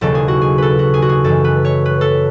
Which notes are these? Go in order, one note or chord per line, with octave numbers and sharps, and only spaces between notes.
E1 D#2 C#3 F#3 A4
G#4
F#4
G#4
A4 B4
F#4
G#4
F#4
G#4
F#2 E3 G#3 A4
B4
C#5
B4
A4